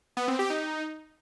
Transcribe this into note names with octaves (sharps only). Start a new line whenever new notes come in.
B3
C4
G4
D#4